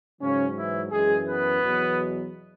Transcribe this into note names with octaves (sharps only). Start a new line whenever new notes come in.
G#2 C#3 F#3 C#4
E3 E4
F#2 E3 G#3 G#4
B3 B4
E2 B2 F#3